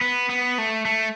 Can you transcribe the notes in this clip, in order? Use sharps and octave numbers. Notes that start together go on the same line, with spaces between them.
B3
B3
A3
A3